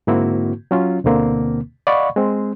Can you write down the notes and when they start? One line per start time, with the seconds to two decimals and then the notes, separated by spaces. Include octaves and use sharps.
0.07 G#2 D3 A#3 C4 E4 F#4
0.71 F#3 C#4 F4
1.04 D2 B2 D3 A#3 C4
1.87 D5 D#5 F5 F#5 B5 C#6
2.16 G#3 C4